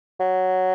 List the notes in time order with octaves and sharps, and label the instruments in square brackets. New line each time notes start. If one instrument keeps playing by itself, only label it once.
[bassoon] F#3